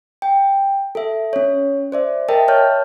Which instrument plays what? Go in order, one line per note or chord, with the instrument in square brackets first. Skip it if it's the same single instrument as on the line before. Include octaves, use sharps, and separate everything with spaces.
[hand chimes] G5
A4 E5
C#4 C#5
C5 D5 E5
A#4 D#5 E5 G5 A5
C#5 A5 F6 G6